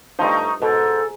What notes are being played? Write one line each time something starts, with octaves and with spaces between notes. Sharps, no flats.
G2 F3 A3 D#4
G#2 B2 A4